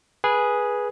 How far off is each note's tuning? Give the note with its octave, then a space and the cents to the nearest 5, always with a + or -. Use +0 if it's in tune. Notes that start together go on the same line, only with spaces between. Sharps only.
G#4 +0 B4 -15